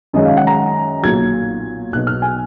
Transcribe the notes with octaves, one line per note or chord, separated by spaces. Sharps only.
F#2 D#3 G#3 C#4 D#5
F5
F#5
A#5
B1 A#2 F#3 G#6
B1 B2 F#3 B3 D#4 F#6
F6
G#5